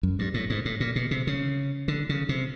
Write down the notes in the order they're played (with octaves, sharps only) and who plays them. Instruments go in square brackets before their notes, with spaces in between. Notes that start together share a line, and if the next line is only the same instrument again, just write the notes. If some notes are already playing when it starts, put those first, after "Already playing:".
[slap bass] F#2
G2
A2
G#2
A2
A#2
B2
C3
C#3
D3
C#3
C3